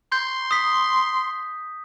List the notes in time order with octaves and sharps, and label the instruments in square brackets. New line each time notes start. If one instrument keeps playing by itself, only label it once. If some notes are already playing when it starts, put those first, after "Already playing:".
[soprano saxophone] C6 [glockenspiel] G6
[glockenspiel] D#6 B6